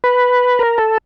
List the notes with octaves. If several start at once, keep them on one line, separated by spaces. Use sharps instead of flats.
B4
A#4
A4